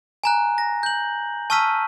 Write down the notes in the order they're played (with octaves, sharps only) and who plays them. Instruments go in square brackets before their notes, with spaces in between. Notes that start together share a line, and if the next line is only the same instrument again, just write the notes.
[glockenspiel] G#5 A#5 F#6
A#6
G6 F#7
A5 C#6 E6 F6 B6 D#7